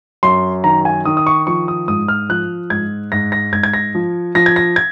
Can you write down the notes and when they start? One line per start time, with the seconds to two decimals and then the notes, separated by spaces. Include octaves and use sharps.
0.23 F#2 C6
0.64 D#3 A#5
0.85 G#5
1.05 D#3 D#6
1.17 D#6
1.27 C#6
1.47 F3 C#6
1.68 D#6
1.88 G#2 D#6
2.08 F6
2.29 F3 F#6
2.70 G#2 G#6
3.12 G#2 A#6
3.32 A#6
3.52 G#2 G#6
3.63 G#6
3.73 A#6
3.95 F3
4.35 F3 A#6
4.46 G#6
4.56 A#6
4.76 G#6